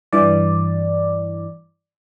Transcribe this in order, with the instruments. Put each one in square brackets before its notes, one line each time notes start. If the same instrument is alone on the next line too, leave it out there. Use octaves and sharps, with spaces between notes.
[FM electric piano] G2 E3 D5